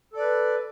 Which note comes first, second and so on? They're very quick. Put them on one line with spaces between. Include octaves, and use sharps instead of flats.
A4 D5 B4